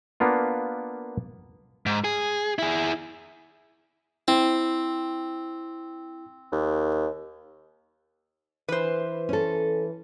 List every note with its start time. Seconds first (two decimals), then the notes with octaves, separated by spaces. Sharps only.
0.20 A#3 B3 D4 F4
1.86 G#2
2.04 G#4
2.59 E4 G#4
4.28 C4 E4
6.52 D#2
8.69 E3 B4 C5
9.29 C#4 A4